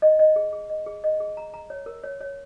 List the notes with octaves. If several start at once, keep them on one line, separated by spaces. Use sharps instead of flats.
D#5
D#5
G#4
G#4
D#5
G#4
D#5
G#4
A#5
A#5
C#5
A#4
C#5
C#5